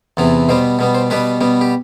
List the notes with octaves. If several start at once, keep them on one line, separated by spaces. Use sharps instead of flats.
E2 C3 E3 B3
B2 G3 B3 C5
B2 G3 B3
C5
B2 G3 B3 B4
B2 G3 B3
G4